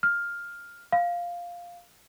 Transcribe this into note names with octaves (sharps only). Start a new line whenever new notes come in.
F6
F5